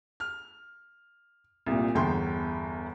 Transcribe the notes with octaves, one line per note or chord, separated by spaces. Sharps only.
F6
C2 A#2
G1 E2 G5 C6